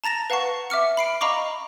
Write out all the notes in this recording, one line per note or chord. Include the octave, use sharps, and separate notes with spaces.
A5 A#5 A6 A#6 E7
B4 F5 F#5 A5 C#6
E5 D6 F6 C#7
B5 C7 D7
D#5 F5 A#5 B5 C#6 D6